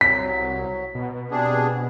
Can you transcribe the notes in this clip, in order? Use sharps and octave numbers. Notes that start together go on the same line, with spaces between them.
C2 F#3 B6
B2
C3 D4 G#4